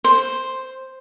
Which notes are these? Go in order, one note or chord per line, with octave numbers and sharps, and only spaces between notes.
C5